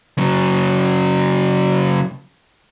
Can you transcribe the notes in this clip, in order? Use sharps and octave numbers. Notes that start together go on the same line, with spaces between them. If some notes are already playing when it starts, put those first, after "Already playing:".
C#3 F#3